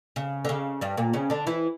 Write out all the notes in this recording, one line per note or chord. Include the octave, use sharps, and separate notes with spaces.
C#3
D3
C#3
G2 G3
A#2 A#3
C#3 C#4
D3 D4
E3 E4